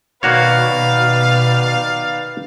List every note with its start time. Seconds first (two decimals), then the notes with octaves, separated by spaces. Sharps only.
0.23 B2 D#3 A#3 F#4 B4 C#5 D5 F5